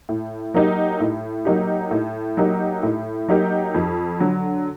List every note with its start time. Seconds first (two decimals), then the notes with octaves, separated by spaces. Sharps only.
0.09 A2
0.54 F#3 A#3 D#4 G4
1.00 A2
1.45 F#3 A#3 D#4 G4
1.91 A2
2.37 F#3 A#3 D#4 G4
2.83 A2
3.28 F#3 A#3 D#4 G4
3.74 F2
4.20 D3 F#3